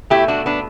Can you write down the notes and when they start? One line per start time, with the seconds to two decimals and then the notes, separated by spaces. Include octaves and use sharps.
0.10 B2 A3 E4 G4
0.28 D4 F#4
0.46 B3 D4